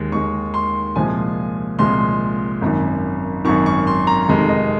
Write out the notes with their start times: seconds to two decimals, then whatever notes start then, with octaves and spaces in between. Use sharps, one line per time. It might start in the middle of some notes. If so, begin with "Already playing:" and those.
Already playing: D#2 D#3 G#3
0.12 D#2 D#3 G#3 C#6
0.54 C6
0.96 C2 A#2 F3 G#3 G#5
1.79 C2 A#2 F3 G#3 C6
2.62 G#1 F#2 D#3
3.45 G#1 F#2 D#3 C#6
3.66 C#6
3.87 C6
4.07 A#5
4.28 F1 F2 C3 D#3 G#3
4.49 D#5